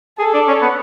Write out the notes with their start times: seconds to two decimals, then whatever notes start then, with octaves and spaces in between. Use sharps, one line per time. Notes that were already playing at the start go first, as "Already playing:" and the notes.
0.19 G#4 A4
0.34 D4
0.48 C#4
0.62 B3